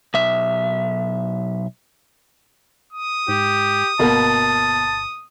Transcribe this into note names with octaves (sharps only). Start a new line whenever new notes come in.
B1 E5
D#6
G#2 G4
G1 B2 A#3 A5